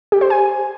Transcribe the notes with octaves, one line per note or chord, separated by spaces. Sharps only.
G4
C5
G#5